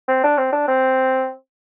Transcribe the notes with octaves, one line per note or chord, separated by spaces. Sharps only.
C4
D4
C4
D4
C4